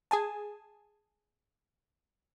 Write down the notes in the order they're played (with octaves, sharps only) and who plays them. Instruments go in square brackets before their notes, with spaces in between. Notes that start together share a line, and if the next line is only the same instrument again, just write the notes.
[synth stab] G#4 G#5 A5